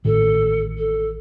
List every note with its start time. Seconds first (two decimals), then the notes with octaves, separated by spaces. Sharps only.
0.05 A1 A2 D#3 A4
0.77 A4